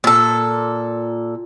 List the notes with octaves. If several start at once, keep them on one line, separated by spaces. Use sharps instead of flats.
A#2 A4